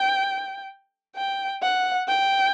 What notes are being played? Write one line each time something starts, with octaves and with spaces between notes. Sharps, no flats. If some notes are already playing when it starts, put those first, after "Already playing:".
Already playing: G5
G5
F#5
G5